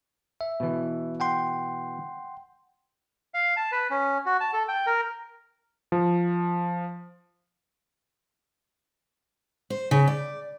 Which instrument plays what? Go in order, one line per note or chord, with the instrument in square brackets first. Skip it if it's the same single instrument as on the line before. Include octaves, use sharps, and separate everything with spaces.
[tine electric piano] E5
[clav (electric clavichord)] B2 E3
[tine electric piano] F#5 G5 C6
[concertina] F5
A5
B4
C#4
F#4
A5
A4
G5
A#4
[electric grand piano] F3
[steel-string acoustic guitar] C5
C#3
D5